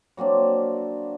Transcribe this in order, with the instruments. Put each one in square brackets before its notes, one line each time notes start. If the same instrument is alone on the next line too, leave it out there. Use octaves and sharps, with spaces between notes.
[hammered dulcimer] F#3 A#3 C4 D4